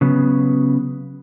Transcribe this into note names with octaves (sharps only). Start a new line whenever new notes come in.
C#3 F#3 B3